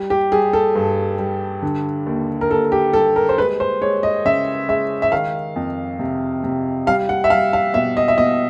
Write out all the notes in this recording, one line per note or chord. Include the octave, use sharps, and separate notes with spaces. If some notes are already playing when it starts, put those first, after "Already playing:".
Already playing: G3
G4
G3 G#4
A4
G2
G3
D3
D#2
A#4
D#2 A4
G4
G3 A4
A#4
C5
G#3 B4
C5
G#3 C#5
D#5
C#3 E5
G#3 E5
E5
D#3 F5
F2
C3
C3
G3 F5
F#5
E5
G3 F5
F5
B2 E5
D#5
E5
B2 D#5